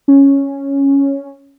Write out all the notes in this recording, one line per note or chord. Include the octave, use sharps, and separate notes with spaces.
C#4